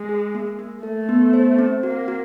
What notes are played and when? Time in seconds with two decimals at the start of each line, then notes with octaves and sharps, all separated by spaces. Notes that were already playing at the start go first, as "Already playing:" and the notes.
Already playing: G#3
0.09 G#4
0.35 A#3
0.59 A#3
0.83 A3 A4
1.09 B3
1.33 C5
1.59 C4
1.83 A#3 F#4
2.08 F#4